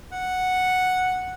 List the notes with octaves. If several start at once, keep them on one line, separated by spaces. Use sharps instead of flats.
F#5